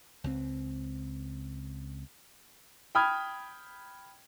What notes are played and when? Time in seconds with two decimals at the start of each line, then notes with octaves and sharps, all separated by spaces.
0.24 C#2 G3 C4
2.95 G5 B5 D#6 F6 G#6